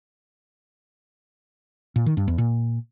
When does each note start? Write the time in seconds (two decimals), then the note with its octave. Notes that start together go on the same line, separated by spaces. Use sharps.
1.96 A#2
2.06 D#3
2.17 G2
2.28 E2
2.38 A#2